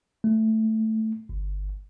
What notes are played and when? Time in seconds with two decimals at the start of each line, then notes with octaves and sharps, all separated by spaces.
0.24 A3
1.29 G1